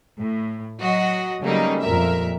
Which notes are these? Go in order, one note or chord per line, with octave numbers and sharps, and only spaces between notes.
A2
F#3 F#4 D#5
C#3 F#3 G3 A3 A#3 D#4
F2 A#2 A#4 E5